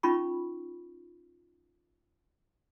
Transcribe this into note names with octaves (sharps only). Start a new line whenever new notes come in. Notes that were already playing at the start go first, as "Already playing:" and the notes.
C#4 D#4 F4 B5 C#6